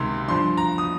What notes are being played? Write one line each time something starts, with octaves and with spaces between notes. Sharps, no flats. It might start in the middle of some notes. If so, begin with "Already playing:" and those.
Already playing: C#2 C3 D#3 C6
G2 F3 C6
A#5
D#6